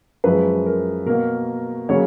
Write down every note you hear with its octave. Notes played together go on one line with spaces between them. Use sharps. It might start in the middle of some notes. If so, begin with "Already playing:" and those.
F#2 F3 G#3 B4
A#4
B2 A#3 A#4
C#3 F#3 A#3 C#5